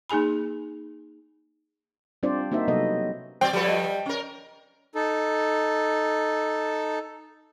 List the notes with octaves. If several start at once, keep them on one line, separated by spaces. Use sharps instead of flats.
A#3 D#4 G#4 G#5 B5
G3 C4 D4 F4 C5 D5
A#3 D#4 F#4 C5 E5
C3 F#3 G3 B3 A4 D#5
F#3 C4 C5 D5 G5
F3 G3 A4 B4
D5 D#5
C#4 A#4
D#4 A4